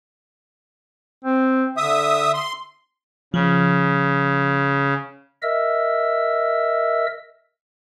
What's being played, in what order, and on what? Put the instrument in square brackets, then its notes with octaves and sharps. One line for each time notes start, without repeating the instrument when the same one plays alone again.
[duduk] C4
[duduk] D3 [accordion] E5 D#6
[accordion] C6
[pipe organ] C#3 [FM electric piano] F3
[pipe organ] A#4 D#5 E5 E6